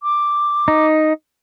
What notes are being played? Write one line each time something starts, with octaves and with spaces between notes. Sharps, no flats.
D6
D#4